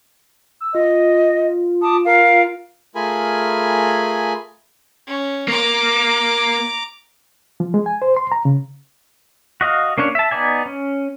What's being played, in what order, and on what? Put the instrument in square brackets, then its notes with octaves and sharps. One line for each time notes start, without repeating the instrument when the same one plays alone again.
[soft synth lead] E6
[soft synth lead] F4 [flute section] D#5
[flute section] A5 D6 D#6
A#4 F5
[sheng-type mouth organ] A3 F4 G#4 A#4 G#5 B5
[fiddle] C#4
[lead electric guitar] A#3 [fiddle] A#5 D6
[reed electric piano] F3
G#3
G#5
C5
C6
A#5
C#3
[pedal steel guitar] F#4 D#5 F5
A#3 C#4 D4 C#5
E5 A5
B3 D#4 D5 G#5
C#4